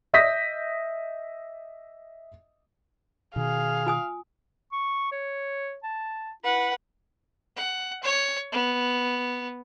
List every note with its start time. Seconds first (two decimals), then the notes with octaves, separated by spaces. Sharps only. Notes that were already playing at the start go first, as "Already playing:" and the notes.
0.13 D#5 E5 D#6 G6 A#6 B6
3.36 B2 D#3 G#4 F5
3.87 F4 G#5 D#6
4.73 C#6
5.12 C#5
5.84 A5
6.44 E4 B4 F#5
7.57 F#5
8.03 C#5
8.52 B3